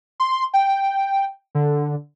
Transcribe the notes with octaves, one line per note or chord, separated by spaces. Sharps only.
C6
G5
D3